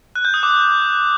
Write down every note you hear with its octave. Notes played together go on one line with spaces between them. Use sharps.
F#6
G6
D#6
D6